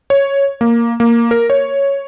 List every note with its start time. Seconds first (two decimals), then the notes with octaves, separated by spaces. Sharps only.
0.10 C#5
0.61 A#3
1.00 A#3
1.31 A#4
1.50 C#5